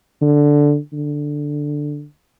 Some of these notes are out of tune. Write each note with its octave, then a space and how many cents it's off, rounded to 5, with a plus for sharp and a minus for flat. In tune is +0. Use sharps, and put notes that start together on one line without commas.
D3 -5
D3 +5